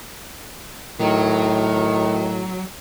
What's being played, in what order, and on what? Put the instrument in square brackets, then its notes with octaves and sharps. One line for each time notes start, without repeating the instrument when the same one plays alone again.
[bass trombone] A2 [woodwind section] D#3 [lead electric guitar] F#3